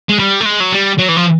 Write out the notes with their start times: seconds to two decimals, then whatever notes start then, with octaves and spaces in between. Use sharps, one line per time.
0.09 G#3
0.19 G3
0.41 A3
0.46 G#3
0.60 F#3
0.72 G3
0.99 F#3
1.09 E3
1.17 F3